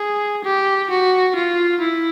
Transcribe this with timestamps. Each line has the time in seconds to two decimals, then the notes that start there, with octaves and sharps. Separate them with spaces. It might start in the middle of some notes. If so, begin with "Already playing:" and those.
Already playing: G#4
0.44 G4
0.90 F#4
1.35 F4
1.80 E4